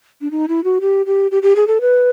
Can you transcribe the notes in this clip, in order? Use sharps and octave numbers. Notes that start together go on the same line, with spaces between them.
D4
D#4
E4
F#4
G4
G4
G4
G4
G#4
A4
B4